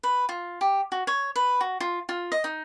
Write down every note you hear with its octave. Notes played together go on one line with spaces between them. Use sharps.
B4
F4
G4
F#4
C#5
B4
F#4
F4
F4
D#5
D#4